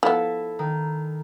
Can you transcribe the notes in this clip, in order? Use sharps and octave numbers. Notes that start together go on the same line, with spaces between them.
F3 B3 E4 A4 A5
D#3